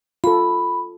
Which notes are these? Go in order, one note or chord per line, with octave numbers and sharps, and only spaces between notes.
F4 A4 B5